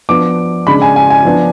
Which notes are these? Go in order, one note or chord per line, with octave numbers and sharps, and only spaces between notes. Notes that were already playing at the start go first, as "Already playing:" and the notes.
F3 B3 D4 D6
C#3 G#3 D4 B5
G#5
G#5
G#5
F3 B3 D4